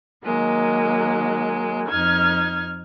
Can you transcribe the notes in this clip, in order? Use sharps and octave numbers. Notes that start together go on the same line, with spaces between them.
D#3 F#3 G#3 A#3
F2 D#4 F6 G#6